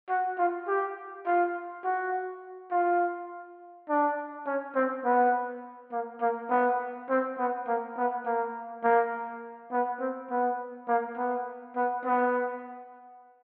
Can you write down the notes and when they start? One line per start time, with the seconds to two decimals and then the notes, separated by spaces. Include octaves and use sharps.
0.09 F#4
0.38 F4
0.68 G4
1.26 F4
1.84 F#4
2.71 F4
3.89 D4
4.47 C#4
4.76 C4
5.05 B3
5.92 A#3
6.21 A#3
6.50 B3
7.10 C4
7.38 B3
7.67 A#3
7.97 B3
8.25 A#3
8.84 A#3
9.71 B3
10.00 C4
10.31 B3
10.88 A#3
11.17 B3
11.76 B3
12.05 B3